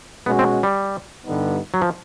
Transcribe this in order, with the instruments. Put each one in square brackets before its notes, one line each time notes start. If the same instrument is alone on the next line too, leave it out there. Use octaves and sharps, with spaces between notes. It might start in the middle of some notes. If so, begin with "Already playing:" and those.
[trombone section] B2 G#3 C#4 F#4 [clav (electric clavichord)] B3
[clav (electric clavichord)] C4
G3
[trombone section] G2 D3 G3 B3 D#4
[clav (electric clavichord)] F#3
F3